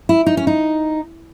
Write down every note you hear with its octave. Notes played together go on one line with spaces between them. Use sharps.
E4
D#4
C#4
D#4